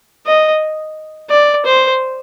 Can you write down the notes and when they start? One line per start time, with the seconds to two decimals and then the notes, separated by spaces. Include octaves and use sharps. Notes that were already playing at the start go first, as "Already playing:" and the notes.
0.26 D#5
1.30 D5
1.65 C5